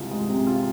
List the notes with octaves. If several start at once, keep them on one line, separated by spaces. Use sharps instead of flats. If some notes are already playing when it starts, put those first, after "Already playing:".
Already playing: C2 C3 G#3 F4
G#3
C3
F4